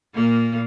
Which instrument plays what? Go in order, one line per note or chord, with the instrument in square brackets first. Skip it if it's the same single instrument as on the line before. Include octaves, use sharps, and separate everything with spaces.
[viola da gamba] A#2 A#3